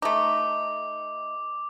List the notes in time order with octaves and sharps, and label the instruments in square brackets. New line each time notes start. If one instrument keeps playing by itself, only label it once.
[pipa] A3 D#4 [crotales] D6